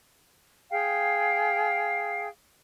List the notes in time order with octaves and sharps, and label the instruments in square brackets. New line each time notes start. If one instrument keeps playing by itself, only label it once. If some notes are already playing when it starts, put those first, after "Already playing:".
[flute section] G#4 F5 G5